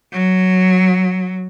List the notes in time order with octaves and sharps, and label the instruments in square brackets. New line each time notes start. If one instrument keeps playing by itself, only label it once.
[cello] F#3